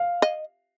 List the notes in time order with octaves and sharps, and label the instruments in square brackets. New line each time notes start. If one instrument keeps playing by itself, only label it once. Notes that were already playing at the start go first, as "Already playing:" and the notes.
Already playing: [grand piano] F5
[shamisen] D#5